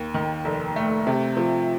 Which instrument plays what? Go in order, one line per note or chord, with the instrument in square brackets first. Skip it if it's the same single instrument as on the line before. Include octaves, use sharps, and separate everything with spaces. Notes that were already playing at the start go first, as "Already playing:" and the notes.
Already playing: [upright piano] D#2
D#3
F1
A3
C3
F3